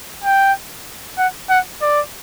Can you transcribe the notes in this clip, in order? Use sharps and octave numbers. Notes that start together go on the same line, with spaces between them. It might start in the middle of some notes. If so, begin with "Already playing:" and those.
G5
F#5
F#5
D5